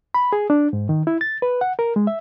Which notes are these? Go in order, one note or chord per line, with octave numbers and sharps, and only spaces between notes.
B5
G#4
D4
G#2
D#3
E4
A6
B4
F#5
A#4
G#3
E5